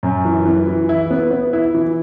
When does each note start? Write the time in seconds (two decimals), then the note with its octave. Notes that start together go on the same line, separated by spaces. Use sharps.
0.03 F#2
0.25 E3
0.45 E3
0.68 E3
0.89 E4
1.10 B3
1.31 B3
1.53 E4
1.74 E3